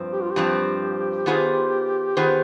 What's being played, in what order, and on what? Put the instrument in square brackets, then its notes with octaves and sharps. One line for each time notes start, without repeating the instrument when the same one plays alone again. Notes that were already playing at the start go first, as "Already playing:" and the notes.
Already playing: [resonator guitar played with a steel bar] G2 F3 C4
[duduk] G4
F4
G4
[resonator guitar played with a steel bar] G2 F3 C4
D#3 B3 F4 G#4 C5
[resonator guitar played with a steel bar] D#3 B3 F4 G#4 C5 [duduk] G4